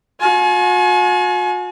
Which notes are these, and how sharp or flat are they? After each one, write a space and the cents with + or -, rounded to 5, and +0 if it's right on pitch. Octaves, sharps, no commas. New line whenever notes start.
F#4 -45 G#5 +35